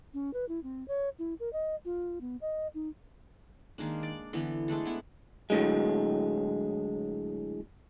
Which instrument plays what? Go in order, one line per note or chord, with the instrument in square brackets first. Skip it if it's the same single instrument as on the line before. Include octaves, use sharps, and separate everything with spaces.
[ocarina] C#4
B4
E4
C4
C#5
E4
A#4
D#5
F4
B3
D#5
D#4
[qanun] D#3 G#3 A#3 D4
D5
D3 E3 B3
G#3 A3 D4 A4
B3 E4
[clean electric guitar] A2 D3 F#3 G#3